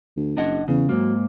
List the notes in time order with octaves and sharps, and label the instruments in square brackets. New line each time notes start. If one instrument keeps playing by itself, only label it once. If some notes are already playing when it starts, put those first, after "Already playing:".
[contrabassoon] D2
[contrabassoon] F#1 [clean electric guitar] D4 D#5 F#5
[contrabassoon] E2 [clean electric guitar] C#3
[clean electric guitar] G#2 A#3 [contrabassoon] F#3